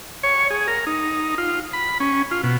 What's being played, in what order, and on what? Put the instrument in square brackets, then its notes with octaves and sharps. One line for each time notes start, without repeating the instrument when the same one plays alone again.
[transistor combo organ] C#5
G#4
A#4
D#4
F4
B5
C#4
F4
B2